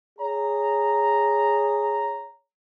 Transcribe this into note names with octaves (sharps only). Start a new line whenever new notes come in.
G#4 C#5 A#5